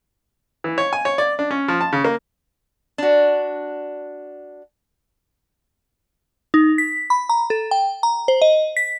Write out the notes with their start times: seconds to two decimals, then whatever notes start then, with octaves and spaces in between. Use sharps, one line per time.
0.64 E3
0.78 C#5
0.93 G#5
1.05 C#5
1.18 D5
1.39 D4
1.51 C#4
1.68 F3
1.81 A5
1.93 C#3
2.05 A#3
2.98 D4 F#4
6.54 D#4
6.78 B6
7.10 B5
7.29 A#5
7.50 A4
7.71 G5
8.03 A#5
8.28 C5
8.42 D#5
8.77 B6